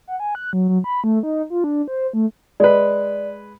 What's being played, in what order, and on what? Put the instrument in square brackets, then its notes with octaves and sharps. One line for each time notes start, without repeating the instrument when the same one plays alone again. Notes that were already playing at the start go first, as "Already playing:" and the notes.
[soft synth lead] F#5
G#5
F#6
F#3
F#3
B5
A3
D#4
F4
D4
C5
A3
[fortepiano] G#3 B4 [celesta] D5